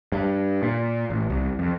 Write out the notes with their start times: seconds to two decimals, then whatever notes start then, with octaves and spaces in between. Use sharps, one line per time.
0.12 G2
0.63 A#2
1.10 A1
1.30 C2
1.59 F2